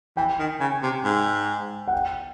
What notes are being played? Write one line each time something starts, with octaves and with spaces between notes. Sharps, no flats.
E3 G5
D#3
C#3
C3
G#2
F#5
G5